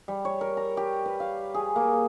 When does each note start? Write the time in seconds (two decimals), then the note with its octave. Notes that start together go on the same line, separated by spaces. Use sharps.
0.08 G3
0.25 C#5
0.41 A#4
0.57 A#5
0.77 G4
1.06 B4
1.20 F5
1.54 G#4
1.76 A#3